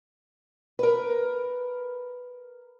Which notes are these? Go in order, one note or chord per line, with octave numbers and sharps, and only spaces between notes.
A#4 B4